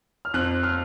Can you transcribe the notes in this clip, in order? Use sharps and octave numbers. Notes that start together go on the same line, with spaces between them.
F6
F2 F#6
F6